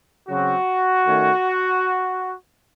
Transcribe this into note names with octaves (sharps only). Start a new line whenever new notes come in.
C#3 F#3 C4 F#4
D#3 A3 C#4